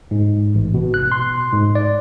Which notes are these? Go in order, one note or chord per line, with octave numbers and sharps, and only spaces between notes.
G#2
A1
B2
F#6
C6
G#2
D5